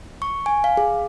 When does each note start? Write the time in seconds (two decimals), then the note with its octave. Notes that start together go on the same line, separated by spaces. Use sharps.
0.22 C#6
0.46 G#5
0.64 F5
0.77 G#4